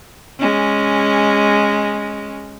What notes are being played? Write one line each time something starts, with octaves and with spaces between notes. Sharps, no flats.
G#3 C#4